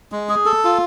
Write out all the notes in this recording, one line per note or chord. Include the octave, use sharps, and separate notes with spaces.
G#3
G#4
A4
F4